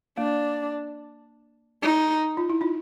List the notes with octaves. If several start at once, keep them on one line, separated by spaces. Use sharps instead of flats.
A#3 D4
D#4
F4
E4
D#4 F4